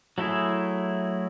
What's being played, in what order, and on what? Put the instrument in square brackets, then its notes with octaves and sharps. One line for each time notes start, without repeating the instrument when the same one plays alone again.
[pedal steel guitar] F#3 A3 E4 G#4